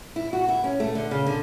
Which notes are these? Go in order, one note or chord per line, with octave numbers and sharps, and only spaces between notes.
E4
F#4
E4
C#4
A3
D3
C#3
D3